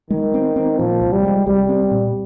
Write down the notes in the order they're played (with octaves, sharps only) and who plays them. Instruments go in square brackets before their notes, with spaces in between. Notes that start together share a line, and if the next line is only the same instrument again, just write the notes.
[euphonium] D#3 [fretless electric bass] G#3
[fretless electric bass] C4
C4
[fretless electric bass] A#2 [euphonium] F3
[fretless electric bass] C2
[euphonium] G3
[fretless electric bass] G#3
[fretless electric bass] C2 [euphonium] G3
[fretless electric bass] C4
A#2